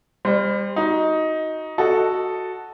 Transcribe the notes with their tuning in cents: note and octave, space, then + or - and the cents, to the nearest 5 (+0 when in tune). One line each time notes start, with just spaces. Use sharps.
G3 +35 C5 +0
D#4 +15 F#4 +0
F#4 +0 A4 +0 D#5 +0